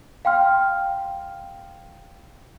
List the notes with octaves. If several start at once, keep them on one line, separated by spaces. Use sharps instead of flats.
F5 G5 C6 F6